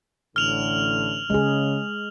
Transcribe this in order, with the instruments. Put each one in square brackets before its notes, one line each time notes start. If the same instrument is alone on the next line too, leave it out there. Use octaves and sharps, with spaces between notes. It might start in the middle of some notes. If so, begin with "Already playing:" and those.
[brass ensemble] A1 A2 D3 [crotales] F6 F7 F#7
[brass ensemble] C#3 [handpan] G#3 G#4